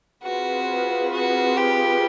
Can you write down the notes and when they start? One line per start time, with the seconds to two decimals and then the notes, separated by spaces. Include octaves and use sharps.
0.23 C4 F4 F#4 G#4 B4
1.12 F#4
1.57 G4